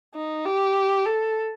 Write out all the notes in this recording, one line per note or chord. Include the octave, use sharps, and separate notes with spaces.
D#4
G4
A4